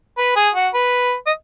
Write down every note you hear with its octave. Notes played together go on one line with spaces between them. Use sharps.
B4
G#4
F#4
B4
D#5